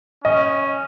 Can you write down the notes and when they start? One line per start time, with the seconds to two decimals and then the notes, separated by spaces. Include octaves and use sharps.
0.24 C#4 D#5